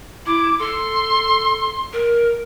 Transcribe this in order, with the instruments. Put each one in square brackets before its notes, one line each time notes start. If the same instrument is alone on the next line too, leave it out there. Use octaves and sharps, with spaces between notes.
[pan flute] E4 [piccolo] D6
[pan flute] A4 [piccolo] C6
[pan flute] A#4